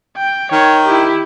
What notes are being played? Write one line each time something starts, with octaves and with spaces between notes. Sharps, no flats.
G5
D#3 C#5
E4 G4